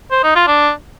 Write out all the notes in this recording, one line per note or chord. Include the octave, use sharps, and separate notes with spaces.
C5
D#4
F4
D4